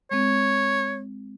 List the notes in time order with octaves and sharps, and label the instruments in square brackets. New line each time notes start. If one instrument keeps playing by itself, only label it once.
[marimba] G#3 C4 [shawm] C#5